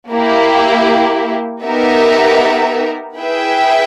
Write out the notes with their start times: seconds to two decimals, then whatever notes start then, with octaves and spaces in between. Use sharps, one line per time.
0.10 A#3 E4 G4
1.64 B3 D#4 G4 A#4 E5
3.17 E4 G#4 B4 E5 G5